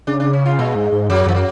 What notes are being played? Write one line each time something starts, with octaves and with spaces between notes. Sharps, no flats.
C#3 D4
D4
C#4
F4
B2 G#3
G#2
G#2
F#2 F#3
F#2 F3
F#3